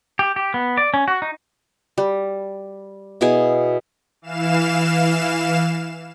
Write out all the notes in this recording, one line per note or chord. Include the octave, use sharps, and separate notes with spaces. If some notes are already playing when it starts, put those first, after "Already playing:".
G4
G4
B3
D5
C#4
F#4
D#4
G3
B2 E4 G#4 G#5
E3 F5 E7